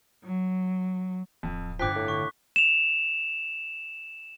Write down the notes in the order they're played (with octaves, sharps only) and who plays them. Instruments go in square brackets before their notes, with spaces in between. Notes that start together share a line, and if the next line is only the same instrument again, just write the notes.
[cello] F#3
[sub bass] D1 [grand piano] F2
[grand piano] G1 G5 [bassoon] F3 [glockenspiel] D6 F#6 B6
[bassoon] A2
[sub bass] D3 [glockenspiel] C#6
[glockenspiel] E7 F7